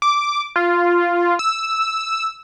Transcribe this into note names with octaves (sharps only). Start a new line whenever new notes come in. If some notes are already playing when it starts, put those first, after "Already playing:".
D6
F4
E6